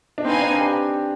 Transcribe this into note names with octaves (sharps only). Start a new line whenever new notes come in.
D4
C4 D#4 B4 F5 G#5
D4
G4